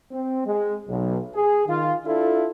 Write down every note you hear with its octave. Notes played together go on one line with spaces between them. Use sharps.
C4
G#3
B1
G#4
D#3 F4
D4 E4 F4 A4